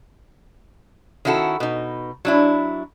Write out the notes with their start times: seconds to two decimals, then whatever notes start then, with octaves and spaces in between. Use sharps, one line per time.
1.25 D#3 C#4 E4 F#4 A4
1.60 B2 D#4
2.25 F#3 D4 E4